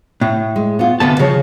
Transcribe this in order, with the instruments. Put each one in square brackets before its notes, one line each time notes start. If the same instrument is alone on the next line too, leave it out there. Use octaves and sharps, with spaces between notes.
[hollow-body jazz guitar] A2
[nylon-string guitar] G#3
B3 F4
[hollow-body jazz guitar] D2 B3 A5 [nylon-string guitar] C3 A4
[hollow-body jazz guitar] C#3 [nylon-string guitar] F3 G#4 C#5